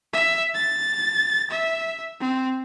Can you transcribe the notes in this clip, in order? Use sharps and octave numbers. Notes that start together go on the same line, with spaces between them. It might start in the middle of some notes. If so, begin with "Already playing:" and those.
E5
A6
E5
C4